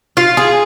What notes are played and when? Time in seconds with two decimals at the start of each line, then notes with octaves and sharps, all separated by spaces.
0.17 F4
0.37 G#4